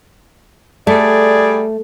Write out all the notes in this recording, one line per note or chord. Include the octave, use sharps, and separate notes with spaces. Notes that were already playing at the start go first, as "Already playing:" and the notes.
G3 A3 G#4 D5